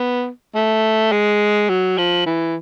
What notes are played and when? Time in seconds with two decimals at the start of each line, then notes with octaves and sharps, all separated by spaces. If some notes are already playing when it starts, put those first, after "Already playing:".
Already playing: B3
0.55 A3
1.12 G#3
1.69 F#3
1.98 F3
2.26 E3